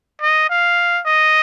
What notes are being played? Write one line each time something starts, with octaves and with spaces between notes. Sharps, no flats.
D#5
F5
D#5